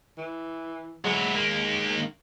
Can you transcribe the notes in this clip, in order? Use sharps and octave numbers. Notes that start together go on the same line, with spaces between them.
E3
F#3 G#3 E4
D#3 A#3